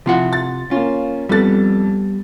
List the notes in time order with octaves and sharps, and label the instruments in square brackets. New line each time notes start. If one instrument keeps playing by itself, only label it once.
[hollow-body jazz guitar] C3 F4 F#5 [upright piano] F3 E4
[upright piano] A6
[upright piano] A#3 C#4 [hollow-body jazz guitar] F4
[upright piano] F2 A4 A6 [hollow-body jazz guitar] G3 B3